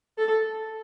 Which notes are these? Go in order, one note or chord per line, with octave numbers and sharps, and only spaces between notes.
A4